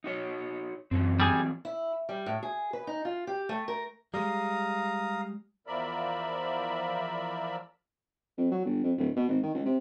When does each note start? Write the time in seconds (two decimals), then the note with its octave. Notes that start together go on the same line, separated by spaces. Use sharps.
0.04 D#4 F#4 C#5
0.91 F#2 E3 F#3 C4
1.20 G3 G#4 G#5
1.65 E4
2.09 G3
2.26 A2
2.43 G#4
2.73 B4
2.87 D#4
3.05 F4
3.27 G4
3.49 A3
3.68 A#4
4.14 G3 G#3 F5 A#5 D#6
5.67 E2 F3 A#4 D5 E5 B5
8.38 F2
8.52 F#3
8.65 G1
8.83 F2
8.97 D1
9.16 B2
9.28 G#1
9.43 D#3
9.54 C#2
9.66 C3